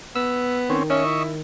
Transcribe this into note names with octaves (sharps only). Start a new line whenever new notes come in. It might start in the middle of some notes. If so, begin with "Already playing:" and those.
B3 E6
D#3 C4 C#4
C#4 D#5 E5 C#6
E4